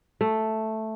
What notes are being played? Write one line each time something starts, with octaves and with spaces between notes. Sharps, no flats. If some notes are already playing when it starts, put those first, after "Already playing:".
A3